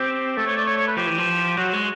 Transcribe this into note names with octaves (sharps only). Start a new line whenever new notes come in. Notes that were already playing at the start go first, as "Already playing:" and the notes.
Already playing: C4 G4
A3 A4
C#5
D5
C#5
C#5
B4
F3 G4
E3
F3
F#3 F#4
G#3